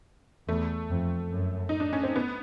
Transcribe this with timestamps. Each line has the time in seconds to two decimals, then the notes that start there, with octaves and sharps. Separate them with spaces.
0.49 E2 A3
0.90 F2
1.32 F#2
1.69 D#4
1.80 D4
1.93 C#4
2.04 C4
2.16 B3